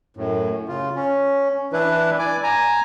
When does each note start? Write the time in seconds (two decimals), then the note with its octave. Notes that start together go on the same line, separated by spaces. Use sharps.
0.17 F#2 A2
0.68 C#3 F4
0.96 C#4
1.73 E3 D4 E4 B4
2.19 D5 G#5 D6
2.43 G#5 A#5